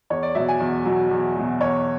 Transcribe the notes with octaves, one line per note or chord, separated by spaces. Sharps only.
E2 C#5
D5
B2 F#3 E5
G#5
E2
B2 F#3
E2
B2 F#3
E2 C#5